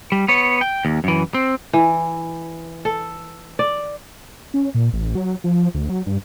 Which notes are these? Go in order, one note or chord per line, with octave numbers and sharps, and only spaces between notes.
G3
B3 C#5
G5
D#2
F#2 E3
C4
E3
A4
D5
C#4
A#2
A1
F#3
F3
D2
F#3
G2